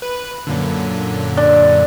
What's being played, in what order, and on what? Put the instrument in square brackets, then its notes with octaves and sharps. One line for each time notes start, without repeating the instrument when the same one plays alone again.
[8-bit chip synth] B4
F#2 A#2 D3
[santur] D4